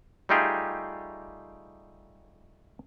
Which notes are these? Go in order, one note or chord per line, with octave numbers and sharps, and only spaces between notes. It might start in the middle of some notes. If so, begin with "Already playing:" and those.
G3 A3 D#4 F4 G4 G#4